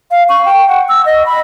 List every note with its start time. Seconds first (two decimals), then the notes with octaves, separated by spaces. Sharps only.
0.11 F5
0.29 C#6
0.45 G5
0.68 F#5
0.89 E6
1.06 D#5
1.26 B5